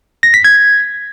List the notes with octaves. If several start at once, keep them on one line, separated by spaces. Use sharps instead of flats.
A#6
B6
G#6